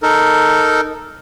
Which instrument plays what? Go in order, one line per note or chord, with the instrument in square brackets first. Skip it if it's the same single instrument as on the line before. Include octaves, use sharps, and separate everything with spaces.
[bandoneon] D#4 A4 A#4